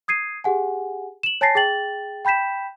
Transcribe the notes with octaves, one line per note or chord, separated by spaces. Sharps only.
D#6 G#6 C7 D#7
G4 G#4 F#5 G#5
E7 F#7
C#5 G#5 A5 A6 A#6 C7
G#4 G5 A6 F#7
G5 B5 G6 B6 E7